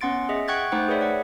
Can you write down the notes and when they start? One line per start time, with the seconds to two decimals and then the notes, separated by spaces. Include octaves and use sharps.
0.01 B3 C#4 F#5 C6 A6 D7
0.29 G#4 D#5 E5
0.48 F#5 G5 C#6 F#6 G#6 A6
0.72 A3 D#4 C5 F#5 G5
0.88 G#4 B4 C#5 D5 E5
1.01 D5 F#5